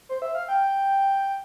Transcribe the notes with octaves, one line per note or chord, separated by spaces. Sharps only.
C5
E5
F5
G5